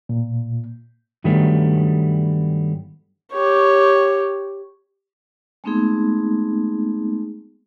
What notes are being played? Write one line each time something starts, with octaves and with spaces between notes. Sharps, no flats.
A#2
G2 D#3 F#3 G3 A3 B3
G4 C#5
G#3 A3 B3 C4 D#4 G#4